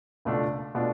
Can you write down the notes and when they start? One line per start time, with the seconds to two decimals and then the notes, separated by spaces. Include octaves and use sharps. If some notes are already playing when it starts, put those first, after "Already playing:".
0.25 C#2 B2 A3 D4 F4
0.75 B2 A3 D4 F4